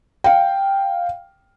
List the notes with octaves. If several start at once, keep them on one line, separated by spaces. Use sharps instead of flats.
F5 G5